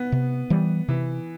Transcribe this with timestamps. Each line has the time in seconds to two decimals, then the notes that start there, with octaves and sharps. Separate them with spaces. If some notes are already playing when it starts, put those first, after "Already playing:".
Already playing: B3
0.12 C3
0.50 E3 G3
0.88 C3 E3